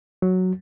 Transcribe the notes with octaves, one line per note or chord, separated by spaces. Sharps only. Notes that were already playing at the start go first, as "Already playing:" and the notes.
F#3